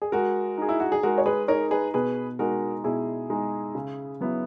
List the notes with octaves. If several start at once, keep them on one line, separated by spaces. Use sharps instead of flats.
G#4
G#3 F#4 A#4
D#4 G#4
E4
F#4
G#4
G#3 F#4 A#4
C#5
G#4 B4
D#4 G#4 A#4 C#5
G#4 B4
B2 G#4 B4
G#3 D#4 F#4 A#4
B2 E4 G#4
G#3 D#4
C#3
F#3 B3 E4